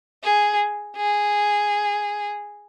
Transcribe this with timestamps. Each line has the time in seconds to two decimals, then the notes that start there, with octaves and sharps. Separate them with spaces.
0.24 G#4
0.96 G#4